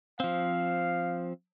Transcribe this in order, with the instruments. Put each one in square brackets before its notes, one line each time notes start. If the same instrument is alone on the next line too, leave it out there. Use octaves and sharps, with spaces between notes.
[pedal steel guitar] F3 C4 [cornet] F5